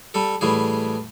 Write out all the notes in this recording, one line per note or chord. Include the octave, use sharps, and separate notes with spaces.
G3 A4
A2 E3 G3 G#4